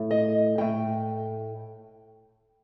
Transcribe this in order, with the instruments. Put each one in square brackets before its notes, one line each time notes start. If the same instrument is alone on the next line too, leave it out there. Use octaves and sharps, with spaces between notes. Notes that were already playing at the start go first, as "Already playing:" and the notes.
Already playing: [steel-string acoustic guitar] A2 A3
D#5
A2 A3 G5